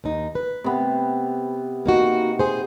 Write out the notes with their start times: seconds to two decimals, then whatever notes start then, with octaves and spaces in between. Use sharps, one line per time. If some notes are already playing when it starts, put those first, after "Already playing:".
0.04 D#2 D#4
0.35 B4
0.64 C3 B3
1.86 A#3 D#4 F#4
2.39 G#4 C5